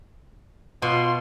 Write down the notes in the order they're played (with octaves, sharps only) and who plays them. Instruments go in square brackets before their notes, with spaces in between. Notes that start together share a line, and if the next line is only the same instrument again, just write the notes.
[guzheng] B2 [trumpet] F4 [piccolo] C6